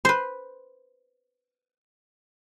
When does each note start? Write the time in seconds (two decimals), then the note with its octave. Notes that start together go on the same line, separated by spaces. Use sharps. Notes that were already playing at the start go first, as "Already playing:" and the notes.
0.05 B4 C5